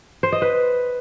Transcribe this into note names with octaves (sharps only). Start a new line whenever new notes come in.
C5
D#5
B4